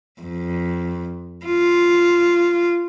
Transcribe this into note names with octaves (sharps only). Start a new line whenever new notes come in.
F2
F4